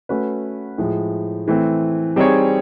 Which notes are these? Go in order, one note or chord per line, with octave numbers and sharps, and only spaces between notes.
A3 C#4 F#4 B4
A2 F3 G#3
E3 A3 C4
G3 C4 D#4 G#4 C#5